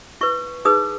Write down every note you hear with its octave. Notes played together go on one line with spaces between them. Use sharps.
E4 B4 C#6
D#4 G#4 B4 D#6